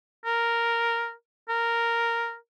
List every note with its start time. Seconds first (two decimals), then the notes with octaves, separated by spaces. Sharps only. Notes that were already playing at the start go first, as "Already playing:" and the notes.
0.25 A#4
1.49 A#4